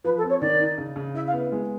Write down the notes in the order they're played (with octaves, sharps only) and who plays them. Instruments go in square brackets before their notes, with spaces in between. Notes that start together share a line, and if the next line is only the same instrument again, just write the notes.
[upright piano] F3 [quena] B4
[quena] A4
[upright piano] C4
[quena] C#5
[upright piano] D#3 [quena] D5
[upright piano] D#4
C#3
C#3
[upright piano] E4 [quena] E5
[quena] F5
[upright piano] B3
G#3